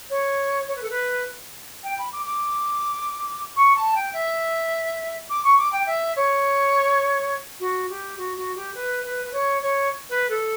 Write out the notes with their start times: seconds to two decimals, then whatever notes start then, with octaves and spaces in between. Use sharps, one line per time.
0.09 C#5
0.67 C#5
0.75 B4
0.82 A4
0.89 B4
1.83 G5
1.98 B5
2.12 D6
2.26 D6
3.56 C#6
3.76 A5
3.95 G5
4.13 E5
5.30 D6
5.44 C#6
5.58 D6
5.72 G5
5.86 E5
6.16 C#5
7.60 F#4
7.89 G4
8.18 F#4
8.37 F#4
8.55 G4
8.74 B4
9.04 B4
9.24 B4
9.32 C#5
9.62 C#5
10.09 B4
10.29 A4